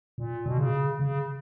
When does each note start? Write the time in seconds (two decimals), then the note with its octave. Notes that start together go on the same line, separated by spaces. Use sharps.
0.18 A#2
0.46 B2
0.58 C#3
1.00 C#3